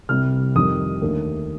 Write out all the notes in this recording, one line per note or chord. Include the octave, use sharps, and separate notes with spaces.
C2 C3 G3 F6
F2 D#3 G3 D#6
D#2 D3 A3 D4